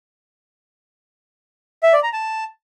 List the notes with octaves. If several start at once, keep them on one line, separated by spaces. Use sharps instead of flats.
E5
D5
A#5
A5